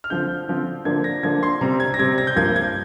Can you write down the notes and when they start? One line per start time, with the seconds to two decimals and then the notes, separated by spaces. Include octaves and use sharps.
0.04 F6
0.10 D3 F3 C4 G6
0.48 D3 F3 C4
0.85 D3 F3 A#3 D4 G#6
1.04 A#6
1.23 D3 F3 A#3 D4 G#6
1.43 C6
1.61 C3 G3 C4 A#5
1.80 G#6
1.94 A#6
1.99 C3 G3 C4 G#6
2.18 A#6
2.27 G6
2.36 G2 F3 A#3 G#6
2.56 G#6